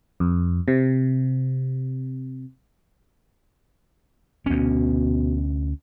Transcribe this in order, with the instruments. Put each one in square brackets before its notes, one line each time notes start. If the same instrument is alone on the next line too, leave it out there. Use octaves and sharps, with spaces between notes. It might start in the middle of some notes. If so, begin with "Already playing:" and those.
[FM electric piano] F2
C3
[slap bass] D2 C#4 [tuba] B2